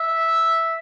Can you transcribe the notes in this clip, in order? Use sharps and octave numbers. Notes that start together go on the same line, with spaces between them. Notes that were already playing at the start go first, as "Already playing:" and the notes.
Already playing: E5